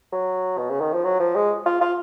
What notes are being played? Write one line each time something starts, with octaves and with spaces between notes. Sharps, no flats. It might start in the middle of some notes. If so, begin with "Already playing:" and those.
F#3
B2
C#3
D#3
F3
F#3
F3
G#3
F4
F4